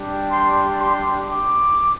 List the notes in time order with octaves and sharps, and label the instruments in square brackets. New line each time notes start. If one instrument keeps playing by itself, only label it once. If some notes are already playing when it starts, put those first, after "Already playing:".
Already playing: [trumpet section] G3 D4 G4
C6
C6
D6